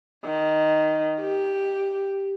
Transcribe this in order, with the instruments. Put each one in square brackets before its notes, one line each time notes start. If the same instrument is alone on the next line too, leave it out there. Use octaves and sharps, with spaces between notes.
[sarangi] D#3
G4